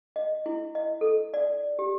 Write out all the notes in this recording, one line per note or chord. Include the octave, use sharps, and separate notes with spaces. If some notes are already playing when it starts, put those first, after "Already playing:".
D#5
E4
D#5
A4
D5
G4